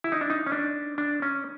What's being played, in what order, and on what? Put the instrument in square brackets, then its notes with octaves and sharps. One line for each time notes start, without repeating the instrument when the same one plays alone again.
[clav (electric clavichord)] E4
D#4
D4
D#4
C#4
D4
D4
C#4